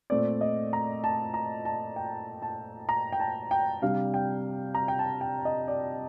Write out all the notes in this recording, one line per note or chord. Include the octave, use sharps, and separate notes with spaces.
A#2 A3 C4 D5
D#5
A#5
A5
A#5
A5
G5
A5
A#5
G5
A5
G5
C3 G3 D4 F5
G5
A#5
G5
A5
G5
D#5
D5